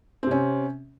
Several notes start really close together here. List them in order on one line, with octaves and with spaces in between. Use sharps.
C4 C3 C#4